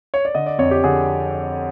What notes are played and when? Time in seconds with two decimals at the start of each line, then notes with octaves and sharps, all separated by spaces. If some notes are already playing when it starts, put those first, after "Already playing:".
0.14 C#5
0.25 D5
0.35 D3 D#5
0.46 D5
0.58 F2 C#5
0.71 G4
0.84 D3 G#4